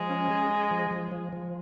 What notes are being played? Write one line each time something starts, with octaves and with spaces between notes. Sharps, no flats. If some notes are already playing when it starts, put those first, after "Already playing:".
Already playing: F3 G#3
C#4
G#4
G#4
F3
F3
F3
F3